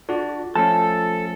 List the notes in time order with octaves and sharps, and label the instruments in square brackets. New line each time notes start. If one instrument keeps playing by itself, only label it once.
[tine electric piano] D4 F#4 D5 [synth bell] F4
[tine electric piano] F3 A3 C#4 [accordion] A4 [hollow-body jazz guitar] A5